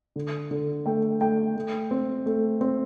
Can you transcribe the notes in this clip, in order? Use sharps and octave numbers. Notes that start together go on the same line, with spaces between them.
D3
D3
A3 G5
A3 G5
A3
C4
A3
C4